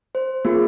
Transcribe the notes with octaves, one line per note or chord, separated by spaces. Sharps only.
C5
A#3 F4 G#4